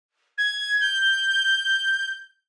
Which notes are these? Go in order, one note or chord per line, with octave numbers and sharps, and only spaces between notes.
G#6
G6